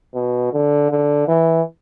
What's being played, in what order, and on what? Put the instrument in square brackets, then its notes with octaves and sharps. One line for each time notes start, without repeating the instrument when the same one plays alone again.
[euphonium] B2
D3
D3
E3